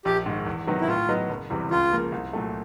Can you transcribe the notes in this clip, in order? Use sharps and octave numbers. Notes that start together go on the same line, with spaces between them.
A#1 G4
G#2 D#3
E2
C3 D#3 F#3 B3
E4
A2 F4
F#3 B3 D#4
F#1
E2 C3 E3 G3
C#2 F4
C#3 F3 A#3
C2
A#2 F#3 A3